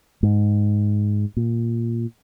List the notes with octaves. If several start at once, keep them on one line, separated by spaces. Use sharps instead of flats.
G#2
A#2